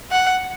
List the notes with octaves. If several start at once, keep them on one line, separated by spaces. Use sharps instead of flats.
F#5